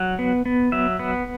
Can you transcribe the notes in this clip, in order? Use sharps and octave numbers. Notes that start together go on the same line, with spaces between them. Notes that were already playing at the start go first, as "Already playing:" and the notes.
Already playing: F#3 F#5
B3
B3
F#3 E5
B3